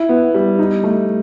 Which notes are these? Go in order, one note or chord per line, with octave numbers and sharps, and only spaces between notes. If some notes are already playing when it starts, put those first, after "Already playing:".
Already playing: E4
B3
G3
D#4
A3